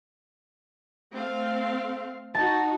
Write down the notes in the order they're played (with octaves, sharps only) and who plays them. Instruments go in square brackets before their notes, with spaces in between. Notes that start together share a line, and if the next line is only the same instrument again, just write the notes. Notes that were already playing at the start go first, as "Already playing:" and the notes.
[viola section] A3 C4 F5
[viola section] D#4 F#4 [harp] A5